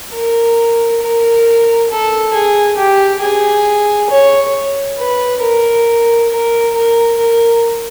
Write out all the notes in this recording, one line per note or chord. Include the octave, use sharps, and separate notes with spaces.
A#4
A#4
A4
G#4
G4
G#4
C#5
B4
A#4
A#4
A#4
A#4